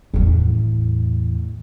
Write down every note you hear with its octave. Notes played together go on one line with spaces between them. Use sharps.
E2 A2